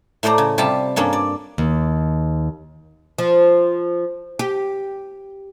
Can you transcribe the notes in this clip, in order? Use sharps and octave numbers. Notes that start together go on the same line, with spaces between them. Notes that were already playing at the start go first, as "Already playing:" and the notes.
A2 A3 C5 D5 A#5
C#3
C3 G3 F4 A5 B5
G2 A#3 C#4 A4
D5
D#2
F3
G4